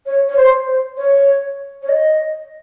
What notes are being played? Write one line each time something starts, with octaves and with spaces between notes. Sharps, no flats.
C#5
C#5
C5
C5
C#5
C#5
D#5